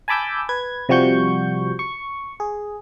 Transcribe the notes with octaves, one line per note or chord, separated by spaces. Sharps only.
G#5 A5 B5 D6 E6 G6
B4 G#6
C3 F3 G3 F#4 C#6 G6
C#6
G#4